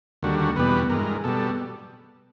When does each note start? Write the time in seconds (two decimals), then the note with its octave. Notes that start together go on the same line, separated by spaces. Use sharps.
0.23 D#2 D3 G3 F#4
0.39 F#4
0.56 E2 B2 G3 B4
0.90 G2 E3 G#3 A#4
1.24 B2 G3 A4